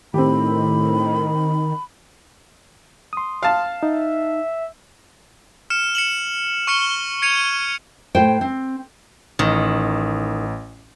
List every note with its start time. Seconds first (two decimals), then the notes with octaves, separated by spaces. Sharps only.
0.14 A2 D#3 C4 G4 B5
3.13 C6 D#6
3.43 F5 A5
3.83 D#4 E5
5.70 F6 C#7 E7
5.95 C#7 E7 F#7
6.67 C#6 F6 C#7 E7 G7
7.22 G#6 C#7 D#7 F7
8.15 A2 C5 G5
8.41 C4
9.39 A1 D#3